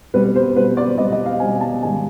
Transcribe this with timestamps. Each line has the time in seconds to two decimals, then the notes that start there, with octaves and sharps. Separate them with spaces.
0.14 B2 G3 C4 B4
0.35 C5
0.56 B2 G3 C4 B4
0.77 D5
0.98 B2 G3 C4 D#5
1.12 D#5
1.26 F5
1.40 B2 G3 C4 G#5
1.61 A5
1.82 G#2 D#3 G3 G#5